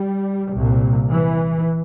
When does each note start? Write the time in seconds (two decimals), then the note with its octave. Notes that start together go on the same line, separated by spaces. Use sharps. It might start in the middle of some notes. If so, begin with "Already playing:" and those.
Already playing: G3
0.54 C2 A#2
1.10 E3